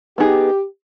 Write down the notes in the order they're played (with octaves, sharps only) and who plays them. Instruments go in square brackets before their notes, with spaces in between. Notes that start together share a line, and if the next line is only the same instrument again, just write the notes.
[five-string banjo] B3 D#4 G#4 [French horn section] G4